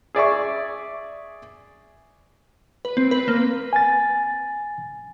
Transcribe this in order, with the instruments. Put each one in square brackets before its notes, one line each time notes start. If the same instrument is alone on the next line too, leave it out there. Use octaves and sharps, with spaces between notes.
[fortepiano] G#4 D5 E5 C#6
[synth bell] B4
C4
B4
A#3
[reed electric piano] G#5 A6